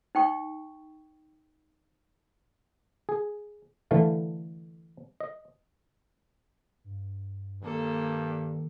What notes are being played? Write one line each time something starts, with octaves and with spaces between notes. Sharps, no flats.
D#4 G5 C#6
G#4
D3 E3 A3 F5 A5
D#5
G2
G2 D#3 A#3 A4